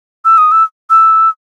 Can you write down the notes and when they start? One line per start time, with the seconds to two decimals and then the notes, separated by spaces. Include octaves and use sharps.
0.25 E6
0.38 D#6
0.52 E6
0.90 E6